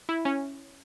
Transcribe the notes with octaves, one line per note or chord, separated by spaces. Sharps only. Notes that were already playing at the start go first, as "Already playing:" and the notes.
E4
C#4